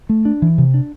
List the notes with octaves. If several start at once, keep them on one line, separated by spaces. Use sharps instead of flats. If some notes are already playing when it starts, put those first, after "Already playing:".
A3
D4
E3
C3
D4